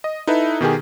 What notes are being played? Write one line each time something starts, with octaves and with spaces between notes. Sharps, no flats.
D#5
D#4 E4 A4 B4 E5
B2 D#3 G4 G#4